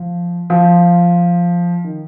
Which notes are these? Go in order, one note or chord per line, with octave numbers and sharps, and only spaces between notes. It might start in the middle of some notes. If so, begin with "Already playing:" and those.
Already playing: F3
F3
D#3